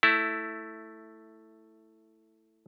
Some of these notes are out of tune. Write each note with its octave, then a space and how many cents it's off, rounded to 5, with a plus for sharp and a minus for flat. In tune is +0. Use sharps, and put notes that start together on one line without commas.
A3 +5 E4 +0